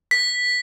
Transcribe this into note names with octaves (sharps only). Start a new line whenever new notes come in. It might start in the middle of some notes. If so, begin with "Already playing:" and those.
B6